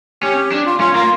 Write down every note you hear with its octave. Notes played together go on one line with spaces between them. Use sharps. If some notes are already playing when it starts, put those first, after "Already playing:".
C#4 G4
D4
F4
C#4 F4
A#3 F4